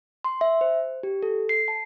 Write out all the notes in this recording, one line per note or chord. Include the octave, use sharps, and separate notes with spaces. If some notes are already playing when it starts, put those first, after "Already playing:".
C6
E5
C5
G4
A4
C7
A5